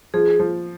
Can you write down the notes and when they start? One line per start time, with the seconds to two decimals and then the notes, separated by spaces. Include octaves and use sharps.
0.14 F3 G#4
0.40 F3